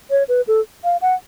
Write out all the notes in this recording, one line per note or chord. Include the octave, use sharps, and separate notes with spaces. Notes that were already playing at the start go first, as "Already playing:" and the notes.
C#5
B4
A4
F5
F#5